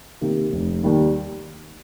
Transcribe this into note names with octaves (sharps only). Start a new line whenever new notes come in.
C3 D#3 A#3 G4
F1
D#2 D#3 G3 A#3